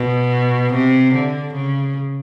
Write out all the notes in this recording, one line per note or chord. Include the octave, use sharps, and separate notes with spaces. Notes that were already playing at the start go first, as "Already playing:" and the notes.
Already playing: B2
C3
D3
C#3